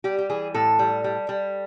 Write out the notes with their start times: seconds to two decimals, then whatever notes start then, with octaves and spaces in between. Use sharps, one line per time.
0.04 G3 G4
0.18 G4
0.29 E3 G#4
0.54 A2 A4
0.79 G3
1.04 G3
1.29 G3